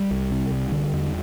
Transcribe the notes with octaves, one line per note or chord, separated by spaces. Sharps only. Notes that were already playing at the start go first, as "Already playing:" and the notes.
Already playing: G3
C2
C3
C2
D3
E2